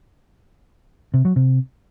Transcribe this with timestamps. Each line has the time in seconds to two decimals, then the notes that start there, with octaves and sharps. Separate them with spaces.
1.14 C3
1.25 F#3
1.36 C3